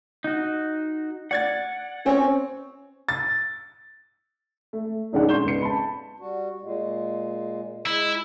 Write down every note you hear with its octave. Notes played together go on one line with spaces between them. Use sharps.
D#4 F#4
D5 F#5 G#6 A6
C4 C#4 C#5
A6
A3
B1 F#2 D#3 G#3 D4 F#5
C6 C#6 G6 E7 G7
G#1 C#2 B3 C#7
A5 B5
G3 F#4
A#2 G#3
G#3 E4